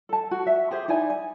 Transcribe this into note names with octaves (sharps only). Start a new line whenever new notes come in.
A4 A5
F#4
E5
G4 G#4 C5
D#4 E4 D5 G#5
G#5